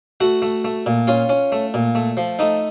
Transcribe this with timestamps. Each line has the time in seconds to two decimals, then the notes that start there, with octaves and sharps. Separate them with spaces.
0.21 A3 F#4
0.42 A3
0.65 A3
0.86 A#2
1.07 C#4 F4
1.29 C#4
1.52 A3
1.74 A#2
1.95 A3
2.17 F3
2.39 A3 D#4